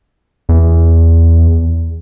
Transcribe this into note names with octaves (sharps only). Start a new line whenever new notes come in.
E2